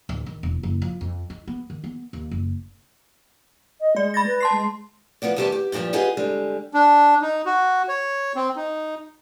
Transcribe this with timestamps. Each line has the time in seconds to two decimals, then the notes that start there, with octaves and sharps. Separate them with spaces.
0.09 D1
0.26 D#3
0.43 E1
0.63 F#1
0.82 F3
1.01 F2
1.30 D#4
1.48 B3
1.70 D#3
1.84 B3
2.13 D#2
2.31 F#1
3.81 D#5
3.96 G#3 D5
4.14 B5 A6 A#6
4.27 B4
4.41 A5 C6 C7
4.52 G#3
5.22 F3 B3 F#4 D5
5.36 D2 D#3 G3 B3 G4 A5
5.52 G4
5.72 G2 A#2 D#3 F3 G3
5.93 F4 G4 G#4 B4 D#5 F#5
6.17 D3 G3 G#3
6.74 D4
7.22 D#4
7.46 F#4
7.88 C#5
8.36 C4
8.56 D#4